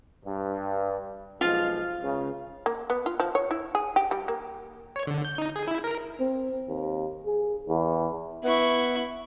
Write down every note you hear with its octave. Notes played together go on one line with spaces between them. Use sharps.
G2
B1 F3 G#3 F4 F5
C#2 C#3
A#3
B3
F4
F3
C#5
E4
G#4
G4
G3
A#3
C#5
D3
G6
D#4
G#4
E4
A#4
C4
D#2
G#4
E2
B3 E4 C#6